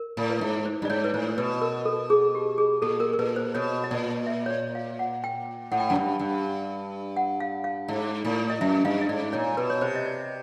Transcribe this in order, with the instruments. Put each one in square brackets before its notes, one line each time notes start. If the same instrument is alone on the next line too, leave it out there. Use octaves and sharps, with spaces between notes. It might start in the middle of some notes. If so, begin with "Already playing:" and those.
Already playing: [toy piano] A#4
[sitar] A2
[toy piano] B4
[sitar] G#2
[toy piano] C5
[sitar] G2
[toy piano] D5
[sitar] G#2 [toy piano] C#5
[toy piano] B4
[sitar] A2 [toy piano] C5
[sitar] B2 [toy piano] B4
[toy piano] A#4
A4
G#4
G4
G#4
[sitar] A#2 [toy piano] A4
[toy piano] A#4
A#4
[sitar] A#2 [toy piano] B4
[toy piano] C5
[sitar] B2 [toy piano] C#5
[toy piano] D#5
[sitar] A#2 [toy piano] D5
[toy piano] E5
C#5
D5
F5
F#5
G5
[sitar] A2 [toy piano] F#5
[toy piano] G5
[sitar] F#2 [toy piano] F#5
[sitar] G2
G2
[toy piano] F#5
F5
F5
[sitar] G#2
A2
[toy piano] D#5
[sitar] F#2 [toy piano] E5
[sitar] G2 [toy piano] F5
[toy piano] D#5
[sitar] G#2 [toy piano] D5
[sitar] A#2 [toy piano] C#5
[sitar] B2 [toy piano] B4
[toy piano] C#5
[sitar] C3 [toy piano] C5
[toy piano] D#5
D5